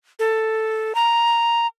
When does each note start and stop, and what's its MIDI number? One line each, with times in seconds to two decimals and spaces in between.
0.19 0.93 69
0.95 1.67 82